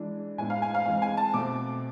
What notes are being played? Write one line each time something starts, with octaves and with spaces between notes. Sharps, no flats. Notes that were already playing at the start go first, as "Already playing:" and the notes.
Already playing: E3 G#3 D4
A2 G#3 B3 G#5
F5
G#5
F5
E3 G#3 C4 F5
G#5
A5
B2 A3 C4 D6